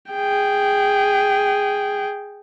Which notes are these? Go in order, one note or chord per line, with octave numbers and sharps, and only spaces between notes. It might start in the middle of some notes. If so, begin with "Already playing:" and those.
G#4 G5